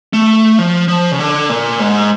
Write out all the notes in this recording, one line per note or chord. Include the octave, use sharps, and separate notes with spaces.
A3
F3
F3
C#3
D3
A#2
G#2